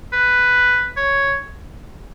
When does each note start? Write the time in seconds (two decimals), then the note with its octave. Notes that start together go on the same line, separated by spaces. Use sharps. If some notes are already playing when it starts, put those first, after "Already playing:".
0.13 B4
0.97 C#5